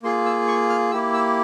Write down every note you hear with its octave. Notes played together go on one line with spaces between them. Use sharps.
A#3 F4 G#4 C6
E6
C#6
F6
A#3 E4 G4 E6
E6